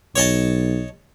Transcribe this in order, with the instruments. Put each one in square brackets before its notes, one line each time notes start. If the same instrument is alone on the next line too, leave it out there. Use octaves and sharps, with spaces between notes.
[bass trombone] B1 [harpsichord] C#5 D#5 A5